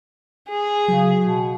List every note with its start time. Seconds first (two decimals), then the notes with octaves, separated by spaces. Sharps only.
0.50 G#4
0.88 C#3 F#3
1.23 B2